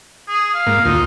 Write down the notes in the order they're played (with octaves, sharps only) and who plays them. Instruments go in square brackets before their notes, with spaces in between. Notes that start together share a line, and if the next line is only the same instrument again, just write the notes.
[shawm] G#4
F5
[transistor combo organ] G#2 A#3
[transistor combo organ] D2 F4 [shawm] D#4